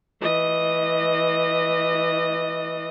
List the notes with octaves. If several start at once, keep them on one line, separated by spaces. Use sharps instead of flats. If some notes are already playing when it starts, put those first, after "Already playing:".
E3 D#5